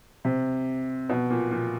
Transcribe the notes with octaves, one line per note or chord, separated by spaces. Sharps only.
C3
B2
A#2
A#2